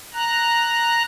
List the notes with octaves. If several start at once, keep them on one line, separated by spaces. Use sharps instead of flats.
A#5 F#6